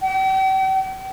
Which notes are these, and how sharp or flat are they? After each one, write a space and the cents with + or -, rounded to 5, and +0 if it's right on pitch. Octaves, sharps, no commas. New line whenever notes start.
G5 -45